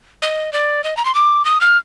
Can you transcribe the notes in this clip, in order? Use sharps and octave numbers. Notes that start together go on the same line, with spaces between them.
D#5
D5
D#5
A#5
C6
D6
D#6
F6